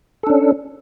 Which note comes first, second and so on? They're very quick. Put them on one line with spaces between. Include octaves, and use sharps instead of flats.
A4 D4 C#4